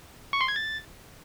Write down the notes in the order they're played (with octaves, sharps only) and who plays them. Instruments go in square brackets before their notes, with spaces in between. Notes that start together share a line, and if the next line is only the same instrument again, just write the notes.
[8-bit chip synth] C#6
C6
G#6
A6